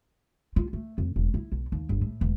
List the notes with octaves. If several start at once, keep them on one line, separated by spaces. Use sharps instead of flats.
F4
A3
F2
E1
E4
B1
D#2
G1
A2
E1